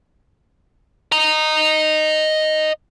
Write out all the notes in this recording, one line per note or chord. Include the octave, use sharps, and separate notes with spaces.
D#5 A#5